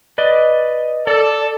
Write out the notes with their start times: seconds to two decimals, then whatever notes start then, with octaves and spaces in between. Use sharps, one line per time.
0.18 B4 D5 D#5
1.07 A4 D5